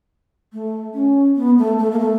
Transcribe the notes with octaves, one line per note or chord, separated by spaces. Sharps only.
A3
C#4
B3
A3
A3
A#3
A3